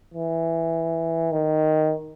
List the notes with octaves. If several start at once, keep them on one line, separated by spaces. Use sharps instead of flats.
E3
D#3